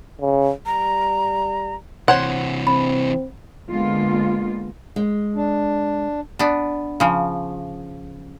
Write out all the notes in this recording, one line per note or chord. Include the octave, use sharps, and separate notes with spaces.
C#3
G3 A#5
C3 E3 C5 C#5 F#5 C6
C4 B5
D3 G#3 A#3 B3 F4
G#3
D4
B3 D4
C#3 F3